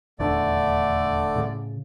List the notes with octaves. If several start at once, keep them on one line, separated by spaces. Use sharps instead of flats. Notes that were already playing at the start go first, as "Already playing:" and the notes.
D#1 E2 D3 A3 D4 D5
A2 C#3